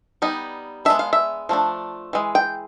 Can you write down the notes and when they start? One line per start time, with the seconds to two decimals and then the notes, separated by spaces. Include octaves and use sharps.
0.22 G3 B3 D#4
0.85 G#3 B3 D4 E5
0.99 F5
1.13 E5
1.49 F3 A3 D4
2.13 E3 G#3
2.35 G5